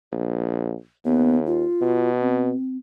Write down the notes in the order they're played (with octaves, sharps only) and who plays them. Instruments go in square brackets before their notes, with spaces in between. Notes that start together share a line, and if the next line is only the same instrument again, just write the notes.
[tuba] A#1
[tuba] D#2 [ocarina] B3
[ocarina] F4
[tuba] B2
[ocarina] C4